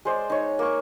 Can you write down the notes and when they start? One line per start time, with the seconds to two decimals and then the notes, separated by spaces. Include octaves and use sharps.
0.05 G#3 C5 D5
0.30 D#4 C#5
0.59 A#3 C#6